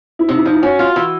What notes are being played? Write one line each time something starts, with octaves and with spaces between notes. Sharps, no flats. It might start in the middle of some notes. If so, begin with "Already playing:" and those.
E4
C3 D#4
E4
F3 D#4
E4
C#4 F#4
F4
E3